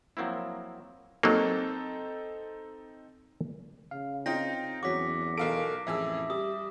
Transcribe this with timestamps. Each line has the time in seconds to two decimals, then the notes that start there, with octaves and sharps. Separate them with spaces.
0.17 F3 F#3 A#3 C4 E4
1.23 F#3 A#3 C4 D#4 A4
3.91 C#3 F5
4.26 C4 D#4 F4 G5 A#6
4.83 E2 F#3 C#4 F#4 D6 B6
5.38 B1 A4 A#4 F5 D7
5.87 A1 F2 G#4 E5 E6
6.30 G3 D#6